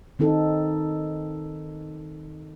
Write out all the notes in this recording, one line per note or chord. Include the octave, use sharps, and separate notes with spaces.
D#3 C4 D#4 A4